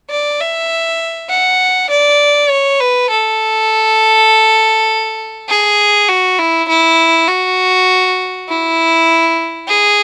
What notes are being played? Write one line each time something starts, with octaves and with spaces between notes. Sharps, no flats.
D5
E5
F#5
D5
C#5
B4
A4
G#4
F#4
E4
E4
F#4
E4
G#4